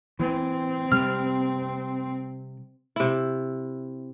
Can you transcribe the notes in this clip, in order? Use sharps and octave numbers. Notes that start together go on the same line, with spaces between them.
E3 C4
C3 G3 F6
C3 E4